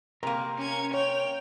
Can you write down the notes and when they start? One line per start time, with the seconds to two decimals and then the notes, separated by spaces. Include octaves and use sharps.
0.23 C3 A#3 A#4
0.58 C#4 G#6
0.94 C#5 G5 F7